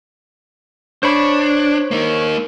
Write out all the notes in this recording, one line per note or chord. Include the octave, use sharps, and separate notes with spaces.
D4 C5 C#5 B5
A#3 D#4